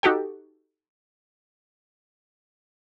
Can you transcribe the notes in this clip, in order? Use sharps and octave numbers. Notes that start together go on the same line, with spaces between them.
D#4 F#4 G4 A4 G5